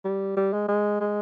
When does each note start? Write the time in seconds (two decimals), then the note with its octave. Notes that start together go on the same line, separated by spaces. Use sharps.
0.05 G3
0.37 G3
0.53 G#3
0.68 G#3
1.00 G#3